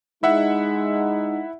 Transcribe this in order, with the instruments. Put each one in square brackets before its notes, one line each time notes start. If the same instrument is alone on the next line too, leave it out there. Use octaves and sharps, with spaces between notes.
[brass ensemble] G#3 D#4 [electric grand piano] E4 E5 F#5